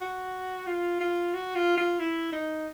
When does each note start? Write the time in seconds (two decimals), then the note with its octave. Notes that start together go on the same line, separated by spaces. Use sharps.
0.01 F#4
0.67 F4
1.00 F4
1.34 F#4
1.55 F4
1.78 F4
1.99 E4
2.32 D#4